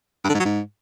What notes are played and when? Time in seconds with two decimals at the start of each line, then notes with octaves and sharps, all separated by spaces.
0.24 G2
0.29 D3
0.35 G#2
0.40 F#3
0.45 G#2